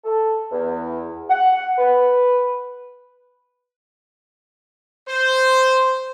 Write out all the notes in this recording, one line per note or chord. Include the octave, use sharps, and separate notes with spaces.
A4
E2
F#5
B4
C5